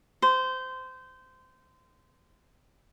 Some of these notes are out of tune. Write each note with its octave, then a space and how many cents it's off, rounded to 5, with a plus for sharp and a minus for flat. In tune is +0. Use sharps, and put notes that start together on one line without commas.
C5 -20